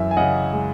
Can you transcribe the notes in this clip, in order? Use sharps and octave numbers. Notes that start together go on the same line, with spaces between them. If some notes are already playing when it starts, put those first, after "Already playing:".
Already playing: F#2 E3 E5
G#5
C#3 D#5 F#5
G#3